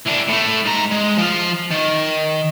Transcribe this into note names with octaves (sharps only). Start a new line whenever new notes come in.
E3 D4
A2 A3
G#2 A#5
G#3
F3 F4
D#3